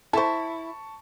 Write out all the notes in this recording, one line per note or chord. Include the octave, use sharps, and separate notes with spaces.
E4 A4 C5 A5 C#6